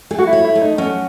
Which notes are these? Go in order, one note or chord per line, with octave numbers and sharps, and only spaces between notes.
A3 G#4
F#4
E4
C#5
E4
A3
D#4
F#3 C#4